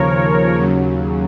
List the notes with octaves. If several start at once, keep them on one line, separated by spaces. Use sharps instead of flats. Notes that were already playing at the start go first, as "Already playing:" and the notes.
Already playing: D#2 C#3 F3 A#4 C#5
D#2 C#3 F#3